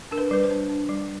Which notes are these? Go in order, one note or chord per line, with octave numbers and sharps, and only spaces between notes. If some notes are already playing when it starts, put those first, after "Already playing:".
D4 A#4
B4
G3 B4
C5
D4
D4
G3